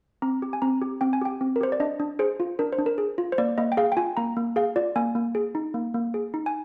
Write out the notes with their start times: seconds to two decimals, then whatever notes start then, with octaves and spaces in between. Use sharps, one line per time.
0.22 C4 A#5
0.42 G4
0.53 G#5
0.62 C4 A#5
0.82 G4
1.01 C4 G5
1.13 G#5
1.21 G4 G5
1.41 C4
1.56 A#4
1.61 G4 C5
1.72 D5
1.80 D4 D#5
2.00 D4
2.19 G#4 C5
2.40 F4
2.59 D4 A#4
2.73 C5
2.78 D4
2.86 A#4
2.98 G#4
3.18 F4
3.32 C5
3.38 A#3 D5
3.58 A#3 D#5
3.72 G5
3.77 G#4 F5
3.92 G5
3.97 F4 G#5
4.17 A#3 A#5
4.37 A#3
4.56 G#4 F5
4.76 F4 D5
4.96 A#3 G#5
5.15 A#3
5.35 G#4
5.55 D#4
5.74 A#3
5.94 A#3
6.14 G#4
6.34 D#4
6.46 G#5